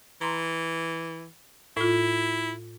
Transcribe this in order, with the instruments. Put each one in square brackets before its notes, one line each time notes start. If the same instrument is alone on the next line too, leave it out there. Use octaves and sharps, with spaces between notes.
[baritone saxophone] E3 [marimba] A#5 C6
[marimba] A2 F4 [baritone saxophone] E4